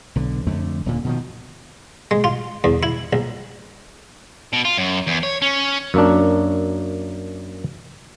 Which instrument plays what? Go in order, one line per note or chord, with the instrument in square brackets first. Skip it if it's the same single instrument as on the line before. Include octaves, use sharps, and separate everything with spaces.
[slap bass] B1 D3
F2 D3 A3
D#1 A#2 D3
B2 D#3 F3
[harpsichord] G#3
F4
E2
E4
A#1
[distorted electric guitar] B2
F4
F#2
E2
C#5
C#4
[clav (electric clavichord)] F#2 A#3 D4